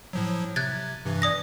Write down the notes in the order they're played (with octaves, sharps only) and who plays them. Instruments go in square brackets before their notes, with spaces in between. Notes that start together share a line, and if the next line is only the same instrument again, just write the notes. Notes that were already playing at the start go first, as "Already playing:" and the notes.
[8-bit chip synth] A2 F3 F#3
[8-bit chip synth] C3 [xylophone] F#6 G#6 A6
[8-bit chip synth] G2 C3 E3
[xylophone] D5 D#6 A#6